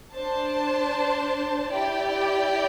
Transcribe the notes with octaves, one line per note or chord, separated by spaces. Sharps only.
D4 C5 A5
E4 G4 D5 G5